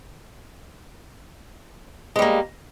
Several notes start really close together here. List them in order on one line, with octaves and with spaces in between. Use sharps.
G#3 G3 A#3